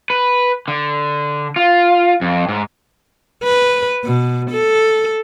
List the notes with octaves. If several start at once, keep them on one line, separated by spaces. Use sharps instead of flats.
B4
D3
F4
F2
G#2
B4
B2
A4